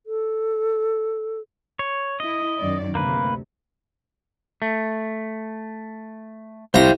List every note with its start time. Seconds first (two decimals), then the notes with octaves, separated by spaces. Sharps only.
0.06 A4
1.79 C#5
2.20 E4 D#5
2.58 F#2 D#3 D5
2.95 D2 C3 A#3 B4
4.62 A3
6.74 C2 C5 F5 G5 A#5